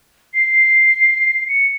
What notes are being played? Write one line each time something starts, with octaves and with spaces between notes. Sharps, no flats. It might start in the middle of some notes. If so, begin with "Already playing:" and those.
C7
C#7